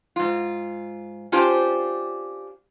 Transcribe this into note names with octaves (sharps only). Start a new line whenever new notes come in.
G#2 F4
C#4 D4 F4 G4 C5